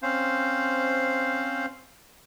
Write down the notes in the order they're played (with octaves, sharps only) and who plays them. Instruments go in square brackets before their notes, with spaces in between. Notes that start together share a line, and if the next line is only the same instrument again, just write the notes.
[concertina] C4 C#4 C5 F5